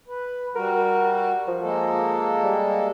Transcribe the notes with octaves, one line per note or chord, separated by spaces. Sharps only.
B4
G3 F#4 A#4
F3
G#3 A#3 A4
G3